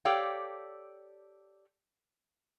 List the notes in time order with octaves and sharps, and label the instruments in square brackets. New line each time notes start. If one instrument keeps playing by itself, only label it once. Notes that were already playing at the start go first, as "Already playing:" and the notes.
[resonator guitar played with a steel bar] G4 A4 C#5 D5 F5 G5